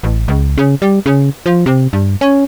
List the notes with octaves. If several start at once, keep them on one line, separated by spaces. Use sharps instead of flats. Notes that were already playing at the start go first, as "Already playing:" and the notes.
A1
C#2
C#3
G3
C#3
F3
C3
G2
C#4